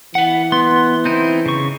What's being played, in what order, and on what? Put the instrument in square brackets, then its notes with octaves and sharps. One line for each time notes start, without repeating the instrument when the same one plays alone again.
[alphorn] E3 [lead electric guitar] B4 F#5
[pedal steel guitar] B3 [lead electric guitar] C6
[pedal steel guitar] C4 D#4 E4
C#3 C#6